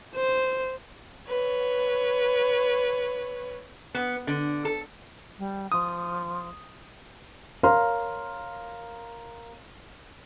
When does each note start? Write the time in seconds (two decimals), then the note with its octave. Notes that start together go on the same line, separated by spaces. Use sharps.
0.15 C5
1.29 B4 C#5
3.95 B3
4.27 D3
4.65 A4
5.38 G3
5.72 F3 D#6
7.63 A#4 C#5 F5 A#5 C6 F6